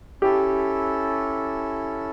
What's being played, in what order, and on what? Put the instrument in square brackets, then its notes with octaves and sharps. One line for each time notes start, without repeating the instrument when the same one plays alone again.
[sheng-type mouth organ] C#4 E4 A4 [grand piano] G4